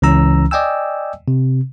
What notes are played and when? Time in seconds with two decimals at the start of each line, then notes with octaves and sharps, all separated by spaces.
0.02 C#2 E3 C#4 A#5 E6
0.51 D5 D#5 G5 G#5 E6
1.28 C3